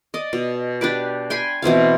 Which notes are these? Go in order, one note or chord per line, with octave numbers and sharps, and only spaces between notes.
D5 D#5
B2
D4 G4 B4 D5
G5 G#5 B5 C6
B2 E3 C4 F5